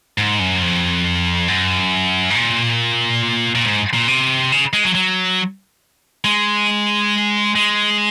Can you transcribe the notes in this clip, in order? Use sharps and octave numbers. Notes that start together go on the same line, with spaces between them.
G#2
F#2
F2
F#2
G#2
A#2
A#2
G#2
A#2
C3
C#3
G#3
F#3
F#3
G#3
G#3